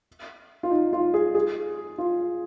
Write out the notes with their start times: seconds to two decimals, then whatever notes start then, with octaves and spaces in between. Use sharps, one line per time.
0.63 F4
0.71 D#4
0.93 F4
1.14 G#4
1.35 G#4
1.98 F4